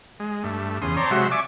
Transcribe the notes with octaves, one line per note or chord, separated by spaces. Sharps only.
G#3
G2 A3
E2 C#3 C6 D#6
C4 C#5 D5 A5 A#5 C6
C3 F#3 G#3 F#4 E5 C6
D5 E5 G#5 C#6 D6